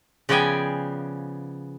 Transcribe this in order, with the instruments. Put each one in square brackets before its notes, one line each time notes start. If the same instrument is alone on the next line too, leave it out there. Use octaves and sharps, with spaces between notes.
[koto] C#3 F3 B3 D5 G5 G#5